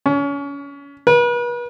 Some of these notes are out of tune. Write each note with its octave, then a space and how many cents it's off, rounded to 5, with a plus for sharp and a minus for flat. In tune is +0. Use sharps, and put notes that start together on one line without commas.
C#4 +30
B4 -40